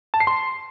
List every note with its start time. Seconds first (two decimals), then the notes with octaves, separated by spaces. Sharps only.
0.14 A5
0.20 C7
0.27 C6